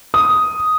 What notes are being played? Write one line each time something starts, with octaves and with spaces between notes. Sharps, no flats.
D#6